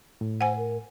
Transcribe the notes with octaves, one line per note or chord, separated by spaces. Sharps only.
A2
C5 F#5 G#5
A#4